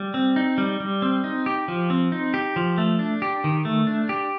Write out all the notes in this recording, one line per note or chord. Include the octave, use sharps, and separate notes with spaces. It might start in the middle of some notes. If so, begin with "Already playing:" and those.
Already playing: G3
C4
D#4
G3
G3
C4
D#4
G4
F3
C4
D#4
G4
F3
A3
D4
G4
D#3
A3
D4
G4